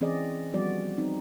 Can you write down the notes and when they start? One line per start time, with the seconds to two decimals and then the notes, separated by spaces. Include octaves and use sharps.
0.01 E3 C4 C#4 G#4 D5 D#5
0.53 F3 G3 B3 F#4 D5
0.98 C4 D#4